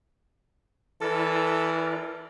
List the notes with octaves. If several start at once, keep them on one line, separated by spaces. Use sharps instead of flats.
E3 E4 A4 A#4 D5